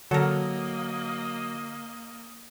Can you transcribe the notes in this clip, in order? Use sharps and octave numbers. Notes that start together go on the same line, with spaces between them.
D3 F#3 A#3 A4 A#4 D#5